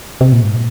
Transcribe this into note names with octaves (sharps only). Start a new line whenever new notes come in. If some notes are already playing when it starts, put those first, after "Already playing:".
C3
A#2
G#2
A#2